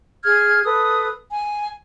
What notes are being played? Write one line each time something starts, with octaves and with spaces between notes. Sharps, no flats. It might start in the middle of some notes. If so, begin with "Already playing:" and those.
G#4 F6 G#6
A4 B4 D#6
G#5